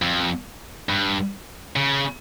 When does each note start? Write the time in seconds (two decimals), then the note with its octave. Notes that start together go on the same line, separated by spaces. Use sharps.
0.02 F2
0.89 G2
1.76 C#3